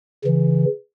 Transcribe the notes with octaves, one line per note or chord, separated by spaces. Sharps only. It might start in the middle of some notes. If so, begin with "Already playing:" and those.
C#3 E3